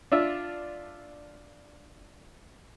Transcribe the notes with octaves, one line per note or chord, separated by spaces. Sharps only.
D4 F4 E5